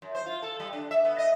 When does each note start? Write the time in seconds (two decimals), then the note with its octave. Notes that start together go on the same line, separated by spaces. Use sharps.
0.02 F#2
0.15 C5
0.26 F4
0.42 A4
0.60 G3
0.73 D4
0.91 E5
1.05 B3
1.18 D#5